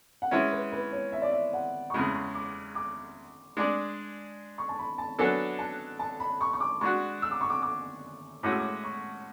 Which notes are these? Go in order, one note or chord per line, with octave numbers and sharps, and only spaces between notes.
F#5
E3 G#3 C#4 E5
B4
B4
C#5
E5
D5
E5
F#5
C#6
E2 C#3 G#3 B5
C#6
D6
D6
G#3 D4 G#4 D5
C#6
A5
B5
A5
F#3 B3 D4 A4 G#5
A5
A5
B5
C#6
C#6
D6
G#3 D4 F#4 C#6
E6
D6
C#6
D6
D6
A2 G#3 C#4 F#4 D6
E6
D6
C#6